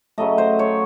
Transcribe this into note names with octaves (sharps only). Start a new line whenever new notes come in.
C#3 F#3 A3 D#5
C5
C#5